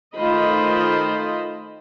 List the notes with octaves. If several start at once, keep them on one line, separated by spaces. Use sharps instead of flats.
D#3 A3 F4 C5 D#5 B5